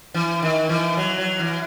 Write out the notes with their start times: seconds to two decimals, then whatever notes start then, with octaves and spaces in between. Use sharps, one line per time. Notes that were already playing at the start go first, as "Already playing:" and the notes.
0.14 E3
0.43 D#3
0.69 E3
0.97 F#3
1.18 F#3
1.39 E3